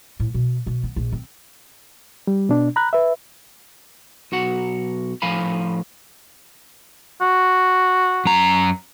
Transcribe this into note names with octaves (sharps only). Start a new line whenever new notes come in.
A2
B2
B2
B3
A#1
C4
G3
B2 D4
A#5 B5 F#6
B4 E5
B1 F#4 F#5
A2 F3 F5 G#5 B5
F#4
F#2 A#5